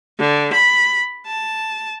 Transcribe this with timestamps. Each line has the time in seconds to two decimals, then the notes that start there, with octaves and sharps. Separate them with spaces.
0.19 D3
0.53 B5
1.26 A5